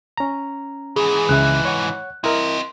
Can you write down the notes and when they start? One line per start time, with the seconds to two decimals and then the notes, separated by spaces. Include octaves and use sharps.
0.17 C#4 A#5
0.96 G#2 E3 G#4
1.29 C#2 C#3 E5 F#6
1.65 C#5 F#5
2.24 C4 E4 A#4 D#5